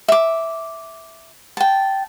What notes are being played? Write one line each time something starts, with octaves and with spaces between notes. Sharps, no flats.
E5 D6
G5 A5